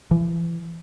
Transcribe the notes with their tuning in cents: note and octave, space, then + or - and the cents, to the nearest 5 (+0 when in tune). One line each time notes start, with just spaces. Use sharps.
E3 +35